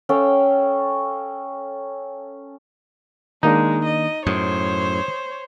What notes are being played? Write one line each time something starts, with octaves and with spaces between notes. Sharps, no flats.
C#4 A4 F5 G5
D#3 G#3 A#3 D4 D#4
D#5
F#2 A2 C5 C#5 D#6